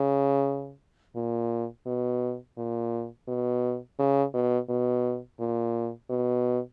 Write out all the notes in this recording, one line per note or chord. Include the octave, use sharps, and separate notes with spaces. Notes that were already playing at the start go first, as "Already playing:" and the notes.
Already playing: C#3
A#2
B2
A#2
B2
C#3
B2
B2
A#2
B2